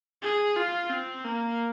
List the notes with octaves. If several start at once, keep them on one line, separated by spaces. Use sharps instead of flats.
G#4
F4
C4
A#3